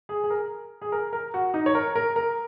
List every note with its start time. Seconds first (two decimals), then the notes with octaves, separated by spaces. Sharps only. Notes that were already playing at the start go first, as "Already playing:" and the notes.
0.09 G#4
0.24 G#4
0.30 A#4
0.82 G#4
0.92 A#4
1.13 A#4
1.34 F#4
1.54 D#4
1.66 C#5
1.75 A#4
1.96 A#4
2.16 A#4